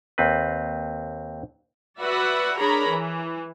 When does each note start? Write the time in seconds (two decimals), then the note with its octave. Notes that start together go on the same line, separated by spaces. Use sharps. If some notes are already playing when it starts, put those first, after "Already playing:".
0.18 D#2 C4 B4
2.00 F#4 B4 D5 E5 F#5
2.59 D4 G#4 A#4 C#5 A#5 B5
2.89 E3